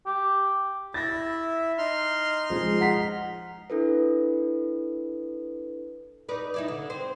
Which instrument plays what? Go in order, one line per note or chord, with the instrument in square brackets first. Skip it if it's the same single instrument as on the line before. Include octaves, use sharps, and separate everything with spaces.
[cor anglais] G4
[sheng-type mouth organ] E4 E5 [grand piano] A6 A#6
[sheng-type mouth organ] D#4 C6 F6
[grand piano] F3 G#3
F#5 A#5 B6
[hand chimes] D4 E4 A4 B4
[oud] D#4 B4 D5
D#4 E4 D5
D3
C4 C5